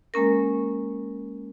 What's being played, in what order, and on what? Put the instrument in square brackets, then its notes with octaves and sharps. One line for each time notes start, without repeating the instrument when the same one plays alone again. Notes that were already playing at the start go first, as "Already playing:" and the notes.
[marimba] G#3 A#3 C#4 A#4